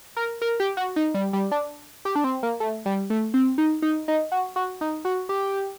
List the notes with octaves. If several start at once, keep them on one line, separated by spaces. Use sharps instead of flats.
A#4
A#4
G4
F#4
D#4
G3
G3
D4
G4
D4
C4
A#3
A3
G3
A3
C4
D#4
D#4
D#4
F#4
F#4
D#4
F#4
G4